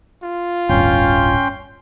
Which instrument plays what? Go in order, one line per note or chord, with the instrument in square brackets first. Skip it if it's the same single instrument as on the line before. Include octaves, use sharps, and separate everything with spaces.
[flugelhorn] F4
[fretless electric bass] D1 G1 G2 [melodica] C#4 G5 C6